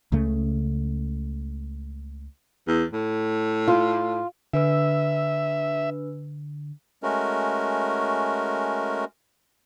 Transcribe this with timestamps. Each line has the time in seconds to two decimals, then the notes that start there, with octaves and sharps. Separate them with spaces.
0.12 C#2 C#3 A3
2.68 E2
2.93 A2
3.68 F4
4.53 D3 D4 B4 E5 E6
7.03 G#3 A3 C#4 F#4 A#4